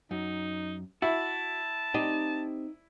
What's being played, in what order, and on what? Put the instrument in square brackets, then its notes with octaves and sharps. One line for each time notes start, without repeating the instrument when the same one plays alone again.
[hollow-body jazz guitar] F#2 [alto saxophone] D#4
[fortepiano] E4 [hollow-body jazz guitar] F#4 [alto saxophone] A5
[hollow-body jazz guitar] C4 G4 [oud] D#4